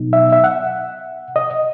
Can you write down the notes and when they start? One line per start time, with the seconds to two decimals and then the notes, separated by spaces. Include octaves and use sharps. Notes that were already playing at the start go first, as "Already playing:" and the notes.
Already playing: B2 F#3 B3 D#4
0.13 E5
0.32 E5
0.44 F#5
1.36 D#5